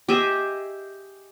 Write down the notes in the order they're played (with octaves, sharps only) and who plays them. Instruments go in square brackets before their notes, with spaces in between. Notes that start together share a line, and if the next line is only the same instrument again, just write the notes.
[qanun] G4 G#4 D#5 E5